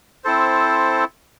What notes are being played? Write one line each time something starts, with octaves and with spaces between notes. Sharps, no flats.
C4 E4 A4 C5